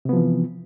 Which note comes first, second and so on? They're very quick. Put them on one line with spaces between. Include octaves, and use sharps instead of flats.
C3 B3 F3 E3